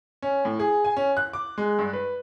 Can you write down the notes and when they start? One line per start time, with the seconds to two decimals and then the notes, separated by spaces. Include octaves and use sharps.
0.22 C#4
0.45 A2
0.60 G#4
0.85 G#5
0.97 C#4
1.17 F#6
1.33 D6
1.58 G#3
1.79 G2
1.93 B4